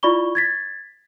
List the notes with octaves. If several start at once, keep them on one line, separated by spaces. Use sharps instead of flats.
E4 F4 D5 B5 C#6 G7
G#6 A6 B6